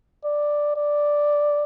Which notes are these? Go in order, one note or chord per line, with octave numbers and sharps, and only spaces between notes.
D5
D5